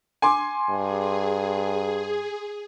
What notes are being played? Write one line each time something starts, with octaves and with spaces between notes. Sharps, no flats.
G#5 C6 D6
G2 G#4